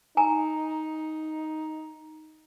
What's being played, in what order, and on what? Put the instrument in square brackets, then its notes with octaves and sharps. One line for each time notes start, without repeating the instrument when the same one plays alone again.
[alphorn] D#4 [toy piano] G#5 A#5